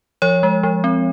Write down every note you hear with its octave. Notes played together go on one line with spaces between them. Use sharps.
F3 C#5
G#3
F3
C4